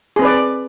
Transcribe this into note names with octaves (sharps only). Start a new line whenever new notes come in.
C4 G#4 B4 D5